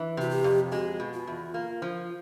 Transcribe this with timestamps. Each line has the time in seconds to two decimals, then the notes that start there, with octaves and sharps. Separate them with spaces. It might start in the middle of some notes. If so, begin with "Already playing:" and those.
Already playing: E3
0.17 C3 F#4
0.31 G4
0.44 F2
0.72 G#3 F#4
1.00 B2
1.13 F4
1.27 E2
1.54 A#3
1.82 F3